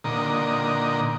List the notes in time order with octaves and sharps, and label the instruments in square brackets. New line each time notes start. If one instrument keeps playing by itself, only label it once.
[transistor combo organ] A#2 D3 D#4 A#5